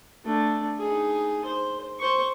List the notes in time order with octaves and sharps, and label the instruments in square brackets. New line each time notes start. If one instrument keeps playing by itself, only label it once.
[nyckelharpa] A3 D4
D#4 G#4
C5
C5 C#6